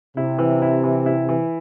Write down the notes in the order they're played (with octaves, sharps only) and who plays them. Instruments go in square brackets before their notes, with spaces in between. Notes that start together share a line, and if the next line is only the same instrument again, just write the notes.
[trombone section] C3 [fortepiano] E4
[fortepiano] E3
E4
E3
E4
E3